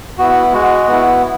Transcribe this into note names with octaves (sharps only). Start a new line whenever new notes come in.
B3 E4 F#4
G#3 F#4
B3 E4